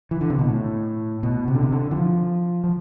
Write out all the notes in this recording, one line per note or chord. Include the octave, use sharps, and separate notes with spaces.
E3
D3
C3
B2
A2
B2
C3
D3
C3
D3
E3
F3
F3